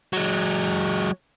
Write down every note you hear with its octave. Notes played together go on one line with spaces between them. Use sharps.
F#3 G#3